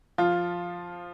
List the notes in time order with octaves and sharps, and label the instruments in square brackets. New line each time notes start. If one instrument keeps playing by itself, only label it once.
[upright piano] F3 F4